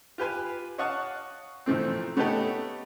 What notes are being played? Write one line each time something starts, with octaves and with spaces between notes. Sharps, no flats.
F4 G4 B4 G#5
C#5 D#5 F5 F#5 A5 C#6
B1 E3 F3 A3 C4
A3 B3 C#4 D#4 G4 A4